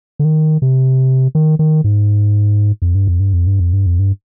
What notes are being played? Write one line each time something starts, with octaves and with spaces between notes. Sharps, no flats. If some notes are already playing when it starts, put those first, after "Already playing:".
D3
D#3
C3
D#3
D#3
G#2
F2
G2
F2
G2
F2
G2
F2
G2
F2
G2